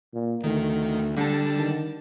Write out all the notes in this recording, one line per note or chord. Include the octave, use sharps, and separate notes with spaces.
A#2
D2 D#3 A3
D3 G3 A5
D#3